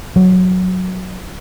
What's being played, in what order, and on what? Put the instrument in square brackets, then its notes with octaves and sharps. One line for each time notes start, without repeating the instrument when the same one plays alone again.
[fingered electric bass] F#3